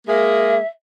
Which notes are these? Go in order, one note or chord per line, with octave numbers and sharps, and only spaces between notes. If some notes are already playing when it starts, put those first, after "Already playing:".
G#3 A#3 G#4 E5